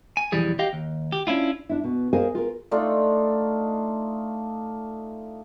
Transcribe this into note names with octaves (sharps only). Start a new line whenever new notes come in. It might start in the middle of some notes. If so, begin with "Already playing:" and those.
G#5
B1 F2 E3 G3 G#4
G4 D#5 F5 G5
D#2
G4
C#4 D4 E4 F4
D4 E4
B2
G#4 A#4 C5 D#5 F5 G#5
F4 A#4
A3 D4 D#4 F4